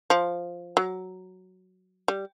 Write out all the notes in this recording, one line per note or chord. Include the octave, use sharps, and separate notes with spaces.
F3
F#3
G3